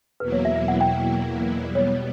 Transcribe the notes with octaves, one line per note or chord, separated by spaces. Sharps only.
E2 B2 F#3 A#3 E4 B4
C#5
E5
E5
F#5
G5
B2 G3 B3 D5
C#5
C#5